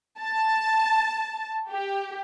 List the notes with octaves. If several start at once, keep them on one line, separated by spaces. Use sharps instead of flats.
A5
G4